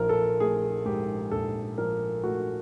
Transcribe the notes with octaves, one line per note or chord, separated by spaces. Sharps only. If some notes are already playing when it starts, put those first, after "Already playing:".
Already playing: A#1 F3 A#4
A4
A3 G#4
G#2 G4
A#1 A4
F3 A#4
A3 F#4